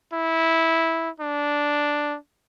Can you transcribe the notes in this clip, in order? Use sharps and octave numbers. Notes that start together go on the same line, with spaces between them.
E4
D4